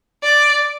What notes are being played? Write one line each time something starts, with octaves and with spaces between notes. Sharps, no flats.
D5